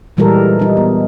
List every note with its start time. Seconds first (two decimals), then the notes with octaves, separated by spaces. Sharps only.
0.17 A#2 E3 G3 G#3 A4 A#4
0.59 G3 D#4
0.77 B3